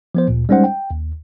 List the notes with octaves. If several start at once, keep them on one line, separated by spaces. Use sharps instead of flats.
F3 B3 C5
D2 A#2
G3 G#3 C#4 D#4 C5 F#5
G5
D#2